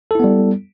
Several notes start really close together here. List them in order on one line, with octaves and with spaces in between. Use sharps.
A4 E4 B3 G3